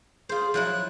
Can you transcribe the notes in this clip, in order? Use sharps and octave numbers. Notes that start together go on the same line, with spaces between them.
F4 G#4 C5
F3 F#3 E4 F#6